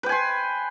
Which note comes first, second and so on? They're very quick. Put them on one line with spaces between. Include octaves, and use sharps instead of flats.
B4 G5 G#5 C6